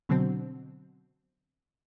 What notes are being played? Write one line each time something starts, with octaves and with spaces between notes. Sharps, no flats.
B2 D3 F#3 C4